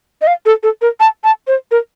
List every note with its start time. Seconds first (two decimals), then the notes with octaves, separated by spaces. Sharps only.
0.22 D#5
0.27 F5
0.46 A4
0.63 A4
0.81 A#4
1.00 A5
1.24 A5
1.47 C5
1.71 A#4